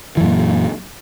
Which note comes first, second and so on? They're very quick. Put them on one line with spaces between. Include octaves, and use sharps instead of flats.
E3 F#2 A#2